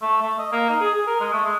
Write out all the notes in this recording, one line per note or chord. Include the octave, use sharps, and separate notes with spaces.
A3
A3
D#5
A#3
D#4
G#4
G#4
A#4
G#3
A3
G#3